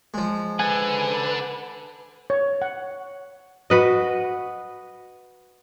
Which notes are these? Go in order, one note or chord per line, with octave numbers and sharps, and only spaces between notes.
F3 G#3
A4 B4 F#5 G#5
C#5
F#5
F#4 B4 D#5